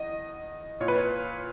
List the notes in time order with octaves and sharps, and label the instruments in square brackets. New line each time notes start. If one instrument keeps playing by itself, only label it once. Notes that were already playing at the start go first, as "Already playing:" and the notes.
Already playing: [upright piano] E2 D#5
A#2 C#5
B4
C#5